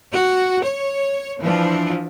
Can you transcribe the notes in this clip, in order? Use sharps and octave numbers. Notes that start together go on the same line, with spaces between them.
F#4
C#5
E3 F3 D4